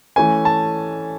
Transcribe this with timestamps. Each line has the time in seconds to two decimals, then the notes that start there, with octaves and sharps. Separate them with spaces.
0.16 E3 A3 C#4 G#5
0.45 A5